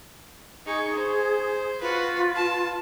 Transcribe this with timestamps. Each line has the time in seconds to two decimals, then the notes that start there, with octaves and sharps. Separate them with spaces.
0.66 D#4 G#4 C#6
0.96 C5
1.81 F4 F#4 B4
2.36 A5